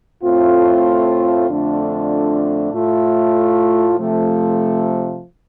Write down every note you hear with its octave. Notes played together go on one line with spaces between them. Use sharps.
A2 A3 C4 F4
F2 D3 A3 D4 F4
A2 A3 F4
C3 F3 A3